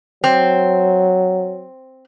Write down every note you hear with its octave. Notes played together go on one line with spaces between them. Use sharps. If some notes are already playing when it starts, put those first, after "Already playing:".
F#3 C4